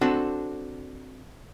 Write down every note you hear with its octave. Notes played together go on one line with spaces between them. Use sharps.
C4 D4 F#4 A4